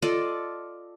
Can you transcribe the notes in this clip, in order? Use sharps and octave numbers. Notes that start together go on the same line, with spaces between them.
F4 A4 D5 D#5